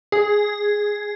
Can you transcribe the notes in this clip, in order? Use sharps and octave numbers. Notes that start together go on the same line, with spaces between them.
G#4